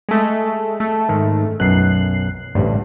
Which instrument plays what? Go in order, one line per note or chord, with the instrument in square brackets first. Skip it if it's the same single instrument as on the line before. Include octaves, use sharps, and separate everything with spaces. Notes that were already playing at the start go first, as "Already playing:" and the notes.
[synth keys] G#3 A3
A3
[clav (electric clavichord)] G#2 D#3
[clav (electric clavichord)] B1 F#2 [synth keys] F#6 C7
[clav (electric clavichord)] A1 D2 [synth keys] G2